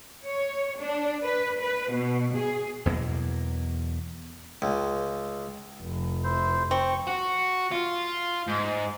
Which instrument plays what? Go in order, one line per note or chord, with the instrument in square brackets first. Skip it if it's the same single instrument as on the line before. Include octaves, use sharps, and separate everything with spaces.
[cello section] C#5
D4
B4
B4
B2
G#4
[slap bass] E2 B2 F#3 A#3
[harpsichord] C#2
[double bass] F1
[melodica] E4 C5
[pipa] C4 [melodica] C#6
[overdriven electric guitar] F#4
F4
G#2